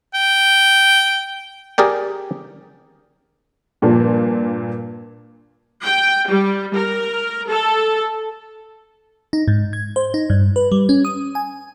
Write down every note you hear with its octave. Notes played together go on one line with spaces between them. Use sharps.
G5
G4 G#4 A#4 D5 G5
G2 A#2 F3 A#3 D4
G5
G3
A#4
A4
D#4
G#2
G#6
C5
D#4
G2
B4
G3
C#4
D#6
G#5